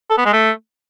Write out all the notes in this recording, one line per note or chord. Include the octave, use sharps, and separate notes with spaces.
A4
B3
G#3
A3